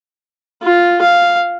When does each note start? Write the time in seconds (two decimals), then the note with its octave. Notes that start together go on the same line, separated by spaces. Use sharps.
0.63 F4
1.02 F5